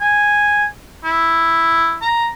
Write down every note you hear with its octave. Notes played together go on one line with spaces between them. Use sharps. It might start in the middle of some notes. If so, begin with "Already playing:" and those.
G#5
E4
A#5